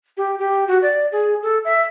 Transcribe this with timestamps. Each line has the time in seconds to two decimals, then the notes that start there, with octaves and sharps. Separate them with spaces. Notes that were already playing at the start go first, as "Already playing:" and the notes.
0.17 G4
0.38 G4
0.68 F#4
0.82 D5
1.12 G#4
1.42 A4
1.65 E5